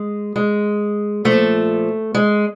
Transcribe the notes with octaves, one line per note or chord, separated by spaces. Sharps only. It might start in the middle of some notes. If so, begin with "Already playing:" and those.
Already playing: G#3
G#3
A#2 F3 A3
G#3